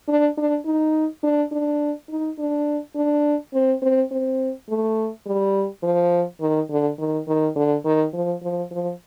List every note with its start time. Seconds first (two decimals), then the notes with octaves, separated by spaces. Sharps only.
0.08 D4
0.38 D4
0.65 D#4
1.23 D4
1.52 D4
2.09 D#4
2.39 D4
2.96 D4
3.54 C4
3.82 C4
4.11 C4
4.69 A3
5.26 G3
5.83 F3
6.41 D#3
6.70 D3
6.99 D#3
7.28 D#3
7.56 D3
7.85 D#3
8.13 F3
8.43 F3
8.71 F3